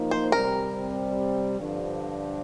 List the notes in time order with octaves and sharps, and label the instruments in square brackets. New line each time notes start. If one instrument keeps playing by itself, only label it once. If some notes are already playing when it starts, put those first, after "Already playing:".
Already playing: [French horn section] F3 A#3 D#4
[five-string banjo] C5
[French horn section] C3 G3 C4 [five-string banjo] A#4
[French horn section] G2 D3 F3